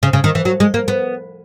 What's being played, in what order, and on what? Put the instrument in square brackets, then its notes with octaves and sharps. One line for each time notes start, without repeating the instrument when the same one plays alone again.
[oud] C#3
C#3
D#3
E3
F#3
G#3
A#3
B3